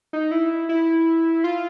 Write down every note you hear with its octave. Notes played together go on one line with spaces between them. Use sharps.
D#4
E4
E4
F4